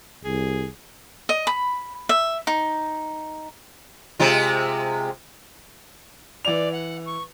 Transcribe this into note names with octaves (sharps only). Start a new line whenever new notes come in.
C2 G#4
D#5
B5
E5
D#4
C3 G#3 F4
E3 D5 F7
F#5
C#6